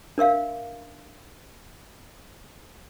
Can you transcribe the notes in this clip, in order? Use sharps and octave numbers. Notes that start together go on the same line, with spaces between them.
D4 A#4 E5 F5